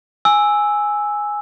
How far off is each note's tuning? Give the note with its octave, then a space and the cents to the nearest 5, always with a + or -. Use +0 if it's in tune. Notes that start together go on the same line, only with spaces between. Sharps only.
G#5 +0 E6 -5